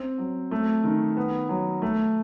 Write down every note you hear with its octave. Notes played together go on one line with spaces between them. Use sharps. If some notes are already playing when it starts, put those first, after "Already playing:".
Already playing: C4
F#3
A3
D#3
B3
F#3
A3